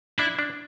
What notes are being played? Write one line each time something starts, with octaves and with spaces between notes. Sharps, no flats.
D4 E4
D4